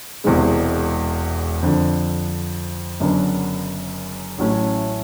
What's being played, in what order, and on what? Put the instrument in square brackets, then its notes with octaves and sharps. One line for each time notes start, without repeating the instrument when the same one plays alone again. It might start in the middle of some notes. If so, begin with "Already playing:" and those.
[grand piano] E1 E2 C3 E3 G#3
F2 D3 F3
F#1 F#2 D3 F#3 B3
A1 A2 F#3 A3 C#4